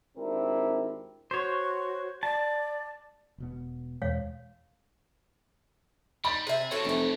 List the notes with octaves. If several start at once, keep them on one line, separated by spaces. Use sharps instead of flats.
G#1 C4 D4 E4 G4 A#4
F#4 C5 C#5
D5 A5
E1 B2 B3
E2 B2 G#3 C#5 F5
G3 D#4 B5 A6
C3 G#4 E5
A2 F3 C#4 F#4 A4
F1 E3 A3